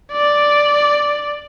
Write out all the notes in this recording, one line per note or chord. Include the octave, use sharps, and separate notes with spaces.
D5